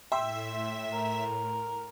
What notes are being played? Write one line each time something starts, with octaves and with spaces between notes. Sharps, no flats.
A2 E5 G5 C6 E6
A#4